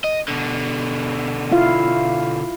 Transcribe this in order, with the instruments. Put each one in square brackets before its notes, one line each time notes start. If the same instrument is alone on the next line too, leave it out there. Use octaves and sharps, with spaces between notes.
[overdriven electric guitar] D#5
B2 D3
[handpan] E4 F4 F5